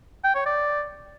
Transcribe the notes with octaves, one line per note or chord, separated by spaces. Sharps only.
G5
C#5
D5